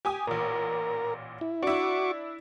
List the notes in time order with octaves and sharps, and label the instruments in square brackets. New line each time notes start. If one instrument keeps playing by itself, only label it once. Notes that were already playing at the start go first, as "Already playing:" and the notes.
[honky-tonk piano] G4 G#5 D#6
[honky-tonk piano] A1 A#2 [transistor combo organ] A#4
[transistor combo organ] E4
[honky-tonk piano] D4 E4 [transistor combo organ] F#4 C#6 D6